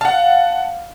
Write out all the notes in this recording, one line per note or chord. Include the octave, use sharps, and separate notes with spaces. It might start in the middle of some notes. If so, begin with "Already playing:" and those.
F5 F#5 A5